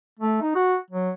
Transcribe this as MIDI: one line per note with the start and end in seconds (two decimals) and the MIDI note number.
0.19 0.37 57
0.42 0.54 63
0.55 0.76 66
0.90 1.11 54